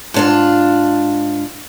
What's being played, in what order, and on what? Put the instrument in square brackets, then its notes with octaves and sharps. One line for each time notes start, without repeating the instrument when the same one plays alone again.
[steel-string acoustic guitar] G#2 D4 F4